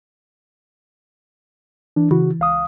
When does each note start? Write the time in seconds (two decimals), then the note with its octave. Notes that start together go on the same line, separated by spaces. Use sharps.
1.96 E3 D4
2.11 C#3 E3 F#4
2.40 C#2 F5 D#6